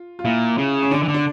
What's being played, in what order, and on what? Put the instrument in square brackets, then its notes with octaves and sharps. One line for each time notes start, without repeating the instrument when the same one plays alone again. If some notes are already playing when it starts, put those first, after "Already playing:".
Already playing: [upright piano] F4
F4
[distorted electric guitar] A#2 [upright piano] E4
[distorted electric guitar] C#3
[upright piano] C#4
[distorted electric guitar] D3 [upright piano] D4
[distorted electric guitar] E3
D3
[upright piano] D4